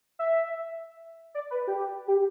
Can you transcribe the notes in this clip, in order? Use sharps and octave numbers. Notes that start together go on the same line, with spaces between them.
E5
D5
B4
G4
G4